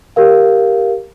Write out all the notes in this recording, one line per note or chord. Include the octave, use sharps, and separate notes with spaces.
G4 A#4 F5